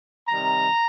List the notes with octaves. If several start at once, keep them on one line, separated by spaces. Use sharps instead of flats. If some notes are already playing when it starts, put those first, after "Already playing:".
C3 D#3 G3 A#5